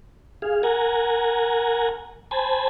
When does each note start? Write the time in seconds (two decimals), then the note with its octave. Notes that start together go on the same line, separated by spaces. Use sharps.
0.42 G#4 F5
0.63 A#4 F#5 G#5 A#5
2.31 C5 G#5 A5 B5